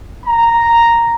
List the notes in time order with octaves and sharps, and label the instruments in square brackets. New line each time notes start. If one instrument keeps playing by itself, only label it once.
[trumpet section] A#5